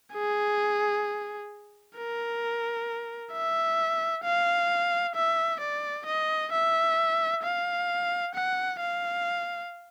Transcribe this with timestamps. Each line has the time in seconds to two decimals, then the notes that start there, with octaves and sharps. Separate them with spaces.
0.14 G#4
1.96 A#4
3.33 E5
4.24 F5
5.15 E5
5.61 D5
6.06 D#5
6.52 E5
7.43 F5
8.34 F#5
8.80 F5